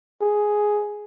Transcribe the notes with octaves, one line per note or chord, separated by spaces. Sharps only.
G#4